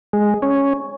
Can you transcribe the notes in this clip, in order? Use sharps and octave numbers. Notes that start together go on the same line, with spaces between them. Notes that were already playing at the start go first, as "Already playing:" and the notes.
G#3
C#4